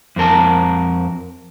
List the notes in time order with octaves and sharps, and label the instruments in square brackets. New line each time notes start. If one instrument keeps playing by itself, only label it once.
[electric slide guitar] F2 C4 A#4 A5